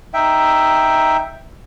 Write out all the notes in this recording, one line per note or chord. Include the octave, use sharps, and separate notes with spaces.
D#4 E5 G5